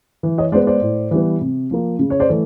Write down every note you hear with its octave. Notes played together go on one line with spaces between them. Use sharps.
E3
C#5 D#5
G#3 B3 C5 D5
C5 D5
A2
E3 G3 B3
C3
F3 A#3
C#3
C#5
C5 D5
E3 A3